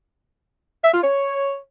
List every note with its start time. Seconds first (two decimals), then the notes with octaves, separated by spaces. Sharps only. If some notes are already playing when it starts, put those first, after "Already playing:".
0.83 E5
0.93 F4
1.03 C#5